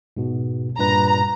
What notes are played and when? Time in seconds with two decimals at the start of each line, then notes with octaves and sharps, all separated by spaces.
0.17 G#2 B2
0.79 G2 A#2 B4 A#5